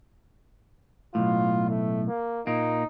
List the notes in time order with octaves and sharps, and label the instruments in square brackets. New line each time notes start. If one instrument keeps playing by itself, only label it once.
[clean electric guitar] B1 F2 A2 [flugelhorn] F4
[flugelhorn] A3
A#3
[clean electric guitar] A#2 A#3 [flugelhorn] D#4